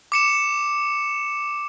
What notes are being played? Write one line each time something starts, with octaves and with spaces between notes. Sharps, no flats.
D6 C#7 E7